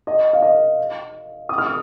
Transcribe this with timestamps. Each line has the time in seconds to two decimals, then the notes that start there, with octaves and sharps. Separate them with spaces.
0.07 D#5
0.33 F5
0.42 D#5
1.49 D#6
1.58 F6
1.67 D#6